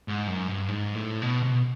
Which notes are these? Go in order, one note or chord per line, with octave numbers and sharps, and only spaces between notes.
G#2
F#2
G2
G#2
A2
B2
C3
B2